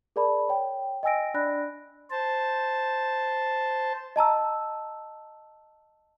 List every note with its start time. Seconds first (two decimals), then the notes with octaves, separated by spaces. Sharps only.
0.16 G#4 A#4 D5 A5 B5
0.49 C#5 G5
1.03 D#5 G5 G#5 E6 A#6 D7
1.34 D4 D5 B5 F#6 A#6
2.11 C5 A5
4.16 D#5 A5 A#5 E6